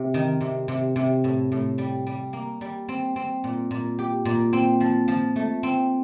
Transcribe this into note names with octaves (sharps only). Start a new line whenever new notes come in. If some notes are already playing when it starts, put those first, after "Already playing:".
Already playing: C3
D#3
C3
C3
C3
A2
A2
G3
G3
A#3
G3
C4
C4
A#2
A#2
G4
A#2
C4
F3
F3
A3
C4